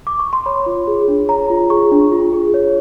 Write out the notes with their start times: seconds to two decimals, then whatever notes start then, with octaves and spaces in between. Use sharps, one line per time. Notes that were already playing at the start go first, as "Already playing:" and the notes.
0.07 D6
0.19 C#6
0.33 C6
0.46 C#5 B5
0.66 F4
0.87 G#4
1.08 D4
1.29 C#5 A#5
1.50 F4
1.70 G#4 C#6
1.92 D4
2.12 F4
2.33 G#4
2.54 C#5